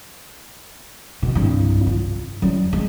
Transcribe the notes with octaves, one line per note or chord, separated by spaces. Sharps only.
B2
C2 G2
F4
F#2 G3
G#3